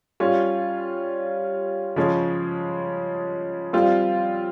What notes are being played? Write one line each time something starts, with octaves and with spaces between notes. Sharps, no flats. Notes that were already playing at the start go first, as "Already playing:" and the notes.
G3 C#4 F4
C#3 F3 G#3 C#4
G3 C4 F4